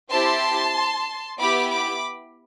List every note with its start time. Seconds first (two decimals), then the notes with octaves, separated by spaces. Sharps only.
0.10 C4 E4 G4 A5 C6
1.39 B3 E4 G4 B5 D6
1.72 B5 D6